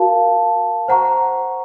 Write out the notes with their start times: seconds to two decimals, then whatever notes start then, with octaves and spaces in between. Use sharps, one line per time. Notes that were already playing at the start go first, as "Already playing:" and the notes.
Already playing: F#4 A#4 F5 A5
0.88 C5 F#5 A#5 C#6